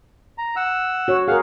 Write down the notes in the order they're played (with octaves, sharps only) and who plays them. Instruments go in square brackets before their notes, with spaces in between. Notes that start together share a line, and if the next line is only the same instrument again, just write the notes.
[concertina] A#5
F#5 E6
[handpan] F#4 C#5
[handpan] G#4 A#4 [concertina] F5 F#5